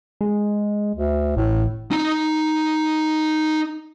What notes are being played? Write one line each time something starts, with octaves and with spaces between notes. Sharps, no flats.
G#3
D2
A1 A2
D#4 A#5